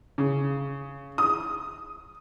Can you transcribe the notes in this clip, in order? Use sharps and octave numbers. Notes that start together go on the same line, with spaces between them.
C#3
D#6